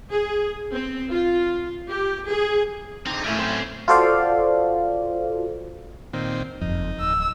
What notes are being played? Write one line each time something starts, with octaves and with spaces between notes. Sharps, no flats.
G#4
C4
F4
G4
G#4
D3 C4 D#4
A2 A3 C#4 E4 A#4 G#5
F#3 C4 C5
F4 F#4 A4 C5 D5 F5
A#2 D#3 C4
F#1 F2 D#4
D1 E6